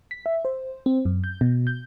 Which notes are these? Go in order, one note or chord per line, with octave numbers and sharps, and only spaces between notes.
B6
E5
C5
C4
F#2
G6
B2
G6